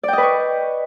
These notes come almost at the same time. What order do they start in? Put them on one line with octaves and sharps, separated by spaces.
D5 G5 D#5 B4 C#6